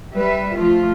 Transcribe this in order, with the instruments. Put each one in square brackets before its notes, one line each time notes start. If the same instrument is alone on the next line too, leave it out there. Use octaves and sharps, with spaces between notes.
[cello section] G3 B4 E5
F3 A3 F4